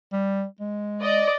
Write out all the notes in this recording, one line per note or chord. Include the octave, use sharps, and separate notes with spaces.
G3
G#3
D5 D#5